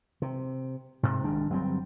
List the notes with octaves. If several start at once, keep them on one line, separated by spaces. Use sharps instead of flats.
C3
G#2 C3
C2 D#3 G#3 D4
G1 F#3 G3 C4